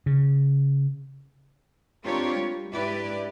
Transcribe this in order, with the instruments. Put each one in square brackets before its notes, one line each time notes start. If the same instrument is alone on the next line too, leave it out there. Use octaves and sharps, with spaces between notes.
[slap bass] C#3
[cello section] C4 D4 F4 G4 A#4 C#5
G3
G#2 D4 E4 G4 B4 D5